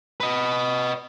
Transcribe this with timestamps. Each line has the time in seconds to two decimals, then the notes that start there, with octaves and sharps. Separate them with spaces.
0.20 B4 D#5